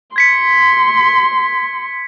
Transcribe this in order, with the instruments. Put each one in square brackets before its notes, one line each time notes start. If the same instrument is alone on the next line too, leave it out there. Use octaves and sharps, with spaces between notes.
[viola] C6 [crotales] G#6 B6 C#7